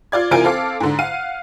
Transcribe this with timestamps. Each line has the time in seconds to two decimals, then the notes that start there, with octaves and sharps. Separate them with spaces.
0.12 F4 D5 G#6
0.31 C3 E3 F4 A#4 G#5 D7
0.44 C4 A4 F5 D6
0.80 G#2 D3
0.99 F5 F#5 D#7